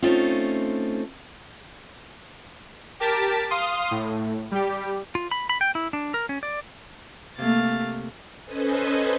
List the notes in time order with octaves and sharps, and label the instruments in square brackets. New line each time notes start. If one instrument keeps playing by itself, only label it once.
[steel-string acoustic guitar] A3 C4 C#4 D#4 F4
[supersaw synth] G4 A#4 A5 A6 B6 D7
F5 C6 D#6
A2
G3 G4
[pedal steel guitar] F4
B5
B5
G5
E4
D4
A#4
C#4
D5
[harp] C3 A#3 [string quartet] A3 F5 A6
[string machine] C#4 A4 B4 C5 D#5 G#5